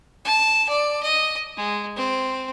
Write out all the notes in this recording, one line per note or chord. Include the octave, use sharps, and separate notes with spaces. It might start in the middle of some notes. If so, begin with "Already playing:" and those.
A5
D5
D#5
G#3
C4